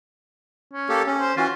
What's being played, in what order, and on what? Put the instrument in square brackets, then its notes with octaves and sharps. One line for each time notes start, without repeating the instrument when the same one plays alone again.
[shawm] C#4
[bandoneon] A#3 G4 A4
C#4
[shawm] C5
[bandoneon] E3 C#4 F#4 [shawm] F4